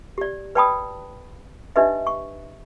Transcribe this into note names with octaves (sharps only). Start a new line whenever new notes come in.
G4 D5
B4 D5 G5 A5 B5 D#6
D4 D#4 G4 B4 D#5 E5
C#6